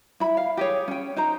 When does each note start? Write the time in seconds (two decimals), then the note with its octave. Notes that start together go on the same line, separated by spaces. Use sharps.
0.20 E4 B5
0.37 F5
0.57 G4 G#4 C#5
0.88 C#4 G5
1.16 D#4 C5 A#5